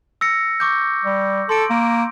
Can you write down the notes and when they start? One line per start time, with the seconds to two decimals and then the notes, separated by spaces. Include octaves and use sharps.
0.21 E6 A#6 C#7
0.60 C#6 D6 G6
1.04 G3
1.49 A4 C6 D7
1.70 A#3